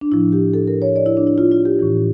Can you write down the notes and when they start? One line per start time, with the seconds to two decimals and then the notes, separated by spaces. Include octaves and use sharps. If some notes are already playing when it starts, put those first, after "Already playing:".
0.01 D4
0.12 A2 F3 E4
0.32 G4
0.54 A4
0.68 A#4
0.82 C#5
0.96 D5
1.06 E4
1.17 D4
1.27 E4
1.38 F4
1.51 F4
1.65 G4
1.79 A2 E3